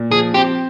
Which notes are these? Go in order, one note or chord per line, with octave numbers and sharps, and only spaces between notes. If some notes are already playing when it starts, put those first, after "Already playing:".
Already playing: A#2
F3 G#4
C4 G4